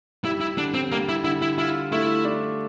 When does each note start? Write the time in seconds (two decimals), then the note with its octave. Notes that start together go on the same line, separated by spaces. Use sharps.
0.24 G3 E4
0.41 E4
0.58 D3 D4
0.74 C4
0.92 G3 A#3
1.09 E4
1.24 D3 E4
1.42 E4
1.58 E4 F4
1.92 A3 E4
2.25 D4